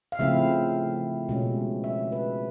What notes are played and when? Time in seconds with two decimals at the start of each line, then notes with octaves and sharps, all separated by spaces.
0.12 F5
0.19 C#3 F3 A3 C4 E4 E5
1.29 B2 G#3 C#4
1.84 E5
2.12 B4